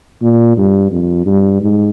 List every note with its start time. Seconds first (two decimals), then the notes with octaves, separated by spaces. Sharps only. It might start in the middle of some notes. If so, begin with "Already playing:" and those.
0.22 A#2
0.57 G2
0.91 F2
1.26 G2
1.62 G#2